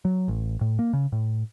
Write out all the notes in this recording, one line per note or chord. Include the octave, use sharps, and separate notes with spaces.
F#3
A1
A2
A#3
C#3
A2